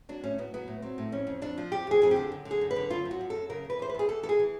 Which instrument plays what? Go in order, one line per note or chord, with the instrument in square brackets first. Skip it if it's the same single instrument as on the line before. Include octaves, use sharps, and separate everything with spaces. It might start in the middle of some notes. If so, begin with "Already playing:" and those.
[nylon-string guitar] F#3 D4
A2 C#4
F#3 B3
F#3 B3
A2
F#3 C4
A2
F2 C#4
F2
F2 D4
F3
F2 G4
F2 G#4
F2 G#4
D3 G4
F#2
D3
G#4
F#2
B4
D3
F#2 F4
F#2
F#4
F#2
A4
F#2
C#3 A#4
E2 B4
E3 C5
B4
E2 G#4
E2 A4
E3 A4
G#4
E3